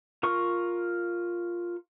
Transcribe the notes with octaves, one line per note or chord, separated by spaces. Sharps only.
F4 A#4 C#6